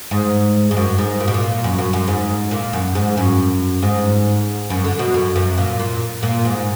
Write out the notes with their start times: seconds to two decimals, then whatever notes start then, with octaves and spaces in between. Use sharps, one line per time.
0.11 G#2
0.71 G#2
0.77 F#2
0.98 G#2
1.20 A#2
1.28 B2
1.34 A#2
1.64 F#2
1.79 F#2
1.93 F#2
2.08 G#2
2.51 A#2
2.73 F#2
2.95 G#2
3.17 F#2
3.82 G#2
4.70 F#2
4.84 D3
4.99 B2
5.14 F#2
5.36 F#2
5.58 A#2
5.79 A#2
6.23 A#2
6.45 G#2